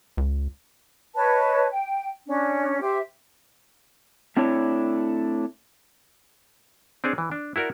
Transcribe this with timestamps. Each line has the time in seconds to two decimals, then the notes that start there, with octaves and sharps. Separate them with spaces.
0.17 C#2
1.15 B4 C#5 D#5 A5
1.70 G5
2.27 C#4 D4
2.81 G4 C5 E5
4.37 A3 C4 D4 E4 C#5
7.04 C4 D4 G#4 C#5
7.18 E3
7.32 D4
7.56 E4 F#4 A#4 D5